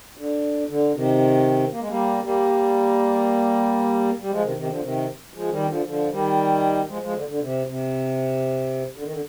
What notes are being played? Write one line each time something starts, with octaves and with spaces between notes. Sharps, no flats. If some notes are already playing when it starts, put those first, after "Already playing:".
D3
D3
C3 D#3
A#3
G#3
G3 A#3
G3 A#3
G3
F3 G#3
C3 D#3
C3 D#3
D3 F3
C3 D#3
F3 G#3
D#3 G3
D3 F3
D3 F3
D#3 G3
F3 G#3
F3 G#3
D3
D3
C3
C3
D3
D#3
D3